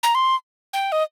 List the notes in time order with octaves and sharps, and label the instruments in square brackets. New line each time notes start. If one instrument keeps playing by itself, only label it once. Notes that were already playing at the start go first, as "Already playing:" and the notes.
[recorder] A#5
C6
G5
D#5